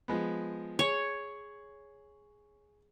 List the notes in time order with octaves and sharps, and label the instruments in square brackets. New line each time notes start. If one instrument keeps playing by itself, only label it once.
[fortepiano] F3 G#3 B3
[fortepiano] G#4 C#6 [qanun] C#5